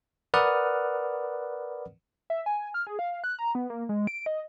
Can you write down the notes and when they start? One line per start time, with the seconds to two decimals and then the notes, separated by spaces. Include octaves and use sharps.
0.34 A#4 B4 D5 F#5 D#6 F6
2.30 E5
2.46 G#5
2.74 F6
2.87 G#4
2.99 F5
3.24 F#6
3.39 A#5
3.55 B3
3.70 A#3
3.89 G#3
4.07 D7
4.26 D#5